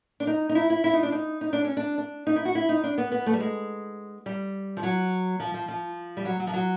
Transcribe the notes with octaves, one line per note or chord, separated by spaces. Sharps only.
D4
D#4
D#4
E4
E4
E4
D#4
D4
D#4
D#4
D4
C#4
D4
D4
D#4
E4
F#4
E4
D#4
D4
B3
B3
A3
G3
G#3
G3
F3
F#3
F3
F3
F3
G3
F#3
F#3
F3
F#3